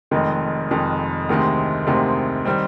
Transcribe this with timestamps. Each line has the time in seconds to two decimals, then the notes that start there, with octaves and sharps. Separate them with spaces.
0.11 F1 F2 D#3 G#3
0.70 F1 F2 D#3 G#3
1.29 D2 C3 D#3 G#3 C4
1.87 D2 C3 D#3 G#3 C4
2.45 D#3 G3 C4